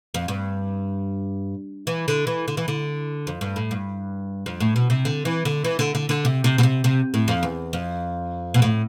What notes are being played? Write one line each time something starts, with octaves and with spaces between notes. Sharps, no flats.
F2
G2
E3
D3
E3
D3
E3
D3
F2
G2
A2
G2
F2
A2
B2
C3
D3
E3
D3
E3
D3
D3
D3
C3
C3
B2
C3
C3
A2
F2
E2
F2
B2
A2